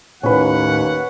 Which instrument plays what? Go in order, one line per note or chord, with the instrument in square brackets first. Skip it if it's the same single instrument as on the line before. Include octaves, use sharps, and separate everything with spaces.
[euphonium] D#2 [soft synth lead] A2 [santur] C#4 B4 [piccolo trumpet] F#5